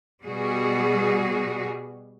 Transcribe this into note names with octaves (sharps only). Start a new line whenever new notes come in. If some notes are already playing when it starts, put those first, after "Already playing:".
B2 G3 F#4 G#4